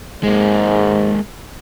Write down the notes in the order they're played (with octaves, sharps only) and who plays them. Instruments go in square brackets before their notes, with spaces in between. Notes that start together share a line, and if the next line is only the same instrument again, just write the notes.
[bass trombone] G#2 [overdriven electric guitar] G#3 A#3